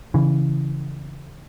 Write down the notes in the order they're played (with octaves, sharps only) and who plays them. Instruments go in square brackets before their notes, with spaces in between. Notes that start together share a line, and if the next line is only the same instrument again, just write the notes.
[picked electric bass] C#3 E3